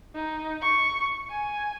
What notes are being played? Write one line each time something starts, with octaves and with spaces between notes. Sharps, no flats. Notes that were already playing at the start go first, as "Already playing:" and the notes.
D#4
C#6
G#5